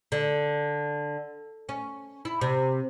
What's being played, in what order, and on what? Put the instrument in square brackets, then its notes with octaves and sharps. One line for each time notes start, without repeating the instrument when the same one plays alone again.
[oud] D3
C#4
E4
C3